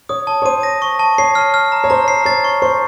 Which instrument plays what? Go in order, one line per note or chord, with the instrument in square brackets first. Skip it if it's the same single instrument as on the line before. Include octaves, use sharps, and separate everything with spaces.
[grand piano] C#5 [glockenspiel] D#6
[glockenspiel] A5
[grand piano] C#5
[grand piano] C5 [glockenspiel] D#7
[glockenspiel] A#6
C#6
A5
[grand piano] C#5 [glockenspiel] C7
[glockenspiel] F6
F6
A#5
[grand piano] C#5
[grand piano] C5 [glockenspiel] A#5
[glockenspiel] C7
[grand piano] C#5 [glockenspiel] A6
[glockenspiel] C#6
[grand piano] C5 [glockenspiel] C#6